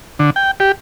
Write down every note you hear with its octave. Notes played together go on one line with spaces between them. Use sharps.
D3
G5
G4